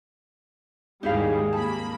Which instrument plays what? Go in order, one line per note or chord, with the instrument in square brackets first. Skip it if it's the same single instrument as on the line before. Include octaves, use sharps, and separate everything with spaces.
[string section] D#2 G#2 G3 [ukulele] D#4 E4 F5 [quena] G#4
[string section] F2 A#3 B5 [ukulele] A5